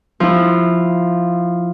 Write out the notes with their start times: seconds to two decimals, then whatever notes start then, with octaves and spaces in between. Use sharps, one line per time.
0.20 F3 E4